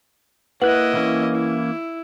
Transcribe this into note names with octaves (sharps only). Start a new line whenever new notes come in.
A#3 E4 B4 D#5 F#5 F#6 F#7
E3 A#3 C#4
E4